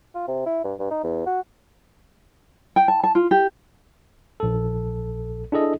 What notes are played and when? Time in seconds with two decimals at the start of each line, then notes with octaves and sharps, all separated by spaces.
0.14 F4
0.28 C3
0.46 E4
0.64 G2
0.79 G2
0.91 D#4
1.03 E2
1.26 F#4
2.76 G5
2.88 A5
3.04 A5
3.15 F4
3.31 G4
4.40 A#1 A4
5.52 D4 E4 G#4 A4 D#5